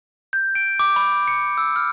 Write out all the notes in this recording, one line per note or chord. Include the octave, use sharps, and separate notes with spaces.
G6
D7
D6
B5
C#7
E6
F6